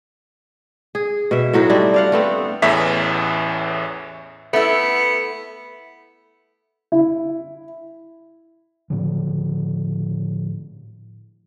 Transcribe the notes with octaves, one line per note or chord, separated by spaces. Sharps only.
G#4
B2 E5
A2 F#3 D#4 F#4
G3 C4 D4 E4
D5 F5 F#5
A3 B3 C4
A1 E2 A2 E3 E5 B6
A3 B3 E4
E4
A2 D3 F3